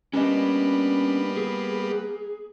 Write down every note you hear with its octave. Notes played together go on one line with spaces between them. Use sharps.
G3 A#3 B3 C#4 D4 D#5
G#4